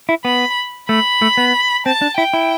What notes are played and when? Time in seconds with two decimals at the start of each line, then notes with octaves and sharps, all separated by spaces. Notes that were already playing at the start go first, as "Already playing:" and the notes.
0.09 E4
0.25 B3 B5
0.89 A3 B5
1.22 A3
1.37 B3
1.86 C4 A5
2.02 D4
2.18 E4 G5
2.33 E4